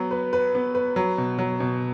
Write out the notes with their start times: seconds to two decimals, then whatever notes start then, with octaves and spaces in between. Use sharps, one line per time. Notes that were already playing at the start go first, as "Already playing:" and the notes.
Already playing: F#3 B3
0.11 B4
0.33 B4
0.55 B3
0.75 B4
0.96 F#3
1.18 B2
1.38 F#3
1.60 B2